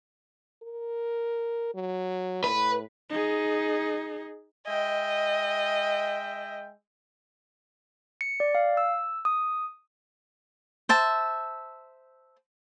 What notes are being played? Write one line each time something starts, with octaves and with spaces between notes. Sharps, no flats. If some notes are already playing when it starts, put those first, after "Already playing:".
A#4
F#3
A2 B4
D#4 G#4
G#3 D#5 E5 G5
C#7
D5
F5
E6
D#6
C5 E5 A5